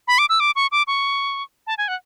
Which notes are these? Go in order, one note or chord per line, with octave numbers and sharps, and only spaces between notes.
B5
D6
E6
D6
C#6
D6
C#6
A5
G#5
F#5